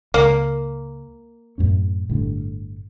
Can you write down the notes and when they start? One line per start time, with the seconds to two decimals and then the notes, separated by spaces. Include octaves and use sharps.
0.14 C#2 A#3
1.58 F#2 A2 C#4
2.09 G1 A2 D3